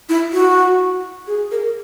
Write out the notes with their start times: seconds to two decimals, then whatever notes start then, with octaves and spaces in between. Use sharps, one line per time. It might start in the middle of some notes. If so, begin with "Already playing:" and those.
0.09 E4
0.33 F#4
1.27 G#4
1.51 A#4